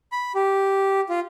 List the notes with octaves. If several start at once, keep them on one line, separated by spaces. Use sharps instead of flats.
B5
G4
F4